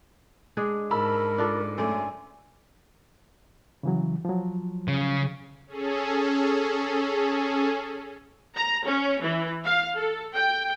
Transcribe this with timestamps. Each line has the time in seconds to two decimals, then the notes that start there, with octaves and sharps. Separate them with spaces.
0.57 G#3 D4 G#4
0.91 G#2 A#4 A5 B5 E6
1.38 D4 F4 A4
1.78 F#2 A3 D5 G#5
3.83 C#3 E3 F#3
4.25 F3 F#3
4.88 C#3
5.67 C#4 G#4 A4
8.56 A#5
8.86 C#4
9.23 E3
9.65 F5
9.97 A4
10.36 G5